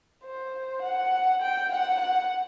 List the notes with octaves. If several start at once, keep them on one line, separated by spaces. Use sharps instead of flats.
C5
F#5
G5
F#5
F#5